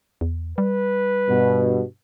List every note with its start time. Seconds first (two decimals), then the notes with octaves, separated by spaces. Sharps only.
0.21 E2
0.58 G3 B4
1.28 G2 B2